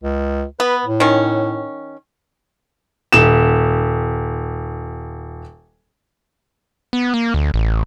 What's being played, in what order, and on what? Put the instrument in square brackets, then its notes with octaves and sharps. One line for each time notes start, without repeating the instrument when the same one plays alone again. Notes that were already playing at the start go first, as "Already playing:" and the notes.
[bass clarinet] C#2
[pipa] B3 [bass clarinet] B4
[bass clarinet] A2
[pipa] D#3 C#4
[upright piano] D#1 E7
[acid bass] B3
A#3
D2
A1